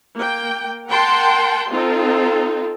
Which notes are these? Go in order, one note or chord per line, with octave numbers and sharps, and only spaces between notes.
A#3 G5
A#4 F#5 G5 A5 C6
C4 D#4 F4 A4